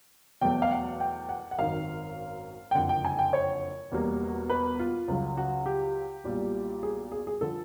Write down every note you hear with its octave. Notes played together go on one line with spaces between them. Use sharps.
E2 B2 F#3 A3 G5
F5
F#5
G5
F#5
F#5
G#1 F#2 D#3 F5
G5
F#1 F2 D3 F#5
G5
G#5
G5
C#5
E1 E2 B2 G3 A#3
B4
F4
C#2 C#3 F#3
F#4
G4
B1 A#2 G3
G#4
G#4
G#4
D3 F3 A4